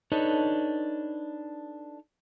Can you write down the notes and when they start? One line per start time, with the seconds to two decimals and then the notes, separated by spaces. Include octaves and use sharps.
0.12 D4 D#4 A4 B4 C#5 D#5